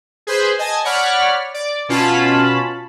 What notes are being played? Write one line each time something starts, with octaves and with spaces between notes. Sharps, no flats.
G#4 B4 C5
D#5 G#5 A5
C#5 D5 F#5 B5 F6
D5
B2 C#4 F4 A5 B5